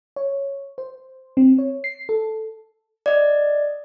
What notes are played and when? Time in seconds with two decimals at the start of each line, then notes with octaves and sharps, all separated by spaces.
0.16 C#5
0.78 C5
1.37 C4
1.58 C#5
1.84 C7
2.09 A4
3.06 D5 D#5